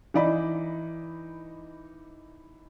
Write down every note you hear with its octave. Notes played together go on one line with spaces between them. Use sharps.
E3 D#4 D5 D#5 B5